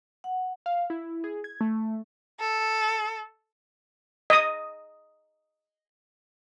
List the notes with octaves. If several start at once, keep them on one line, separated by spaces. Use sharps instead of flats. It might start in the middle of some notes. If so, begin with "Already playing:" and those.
F#5
F5
E4
G#4
G#6
A3
A4
D#5 D#6